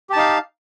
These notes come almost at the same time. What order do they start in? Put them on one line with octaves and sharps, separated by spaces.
G4 A5 D#4 F5